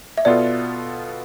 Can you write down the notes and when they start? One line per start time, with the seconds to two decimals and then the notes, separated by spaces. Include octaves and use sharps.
0.18 E5
0.25 B2 B3 F4 A4 D5